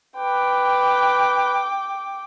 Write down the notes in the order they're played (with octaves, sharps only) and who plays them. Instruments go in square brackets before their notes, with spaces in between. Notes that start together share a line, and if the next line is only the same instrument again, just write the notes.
[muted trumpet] B4 [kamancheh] G5 D6